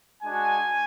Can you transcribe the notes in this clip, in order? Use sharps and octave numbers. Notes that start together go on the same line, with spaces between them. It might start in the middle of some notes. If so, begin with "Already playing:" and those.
G#3 D4 F#4 G#5